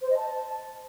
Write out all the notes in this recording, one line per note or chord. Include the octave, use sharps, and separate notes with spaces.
C5
D#5
A5